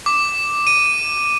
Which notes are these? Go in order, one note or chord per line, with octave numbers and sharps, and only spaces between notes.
D6
D#7